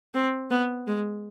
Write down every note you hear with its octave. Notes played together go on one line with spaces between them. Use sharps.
C4
B3
G#3